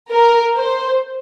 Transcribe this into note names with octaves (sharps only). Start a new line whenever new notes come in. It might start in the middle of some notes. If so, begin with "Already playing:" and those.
A#4
C5